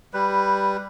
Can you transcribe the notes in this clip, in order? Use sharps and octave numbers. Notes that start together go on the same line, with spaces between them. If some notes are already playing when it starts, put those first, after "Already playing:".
G3 B4